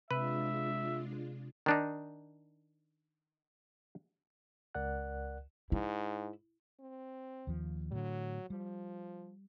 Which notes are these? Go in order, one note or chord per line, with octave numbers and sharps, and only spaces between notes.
C3 G#3 D4 F4 B4 E5
D#3 D4 D#4
C#2 A#4 D5 F#5 F#6
G#2 E4
C4
D#2 F3
A2 D3 F#3
F3 G3